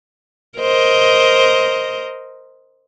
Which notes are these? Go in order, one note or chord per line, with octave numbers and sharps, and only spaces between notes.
A#4 C5 D#5